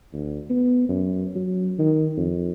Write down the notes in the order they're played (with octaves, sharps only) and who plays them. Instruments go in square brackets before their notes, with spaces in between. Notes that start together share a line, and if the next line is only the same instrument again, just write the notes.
[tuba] D2
B3
F#2
F#3
D#3
F2